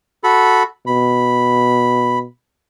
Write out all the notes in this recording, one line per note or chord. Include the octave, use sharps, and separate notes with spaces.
F#4 A4 B5
B2 B5